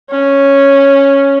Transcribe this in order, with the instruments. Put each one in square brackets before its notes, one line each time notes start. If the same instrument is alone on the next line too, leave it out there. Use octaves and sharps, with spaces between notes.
[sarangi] C#4